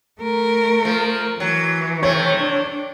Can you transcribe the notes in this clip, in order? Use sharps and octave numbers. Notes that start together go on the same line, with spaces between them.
A3 A#4
F3
E3 F#3
C3 A3 C#5
D4